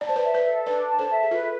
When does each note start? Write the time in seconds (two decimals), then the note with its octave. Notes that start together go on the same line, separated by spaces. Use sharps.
0.01 D5 A5
0.09 C5
0.16 B4 D5
0.24 E5
0.34 B4 D5
0.44 A4
0.66 D4 B4 D5
0.87 A5
0.99 A4 C5
1.10 E5
1.23 G#4
1.31 F4 A4 B4